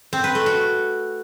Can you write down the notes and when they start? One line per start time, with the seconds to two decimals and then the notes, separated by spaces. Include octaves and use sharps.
0.13 C4
0.24 B4
0.35 A3
0.46 F#4